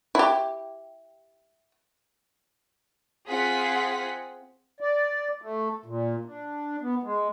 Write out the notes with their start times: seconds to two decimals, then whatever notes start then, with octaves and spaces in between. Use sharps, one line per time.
0.15 E4 G4
3.29 C4 F4 G#4 F#5 B6
4.80 D5
5.42 A3
5.86 A#2
6.25 D4
6.82 B3
7.03 G#3